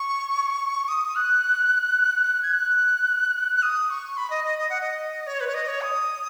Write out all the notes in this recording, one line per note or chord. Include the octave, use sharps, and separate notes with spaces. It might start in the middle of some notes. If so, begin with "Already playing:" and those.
Already playing: C#6
D#6
F#6
G#6
F#6
F#6
D#6
C#6
B5
D#5
D#5
D#5
F#5
D#5
C#5
B4
C#5
D#5
C#5
D#6